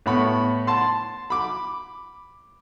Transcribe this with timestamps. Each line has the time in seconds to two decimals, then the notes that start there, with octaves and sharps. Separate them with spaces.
0.06 A2 B3 B5 C#6
0.67 A5 C6
1.30 B5 D6